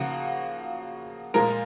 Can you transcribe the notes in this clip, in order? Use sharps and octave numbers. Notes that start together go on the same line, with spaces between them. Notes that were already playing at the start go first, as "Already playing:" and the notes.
Already playing: C#3 F3 A#3 F#4
A#2 F3 G#3 A#4